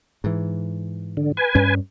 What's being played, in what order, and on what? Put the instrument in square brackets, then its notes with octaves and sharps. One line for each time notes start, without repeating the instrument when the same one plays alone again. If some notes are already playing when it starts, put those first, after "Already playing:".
[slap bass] G#2 E3
[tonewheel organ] D3
B4 G#5
[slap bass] G2 C#4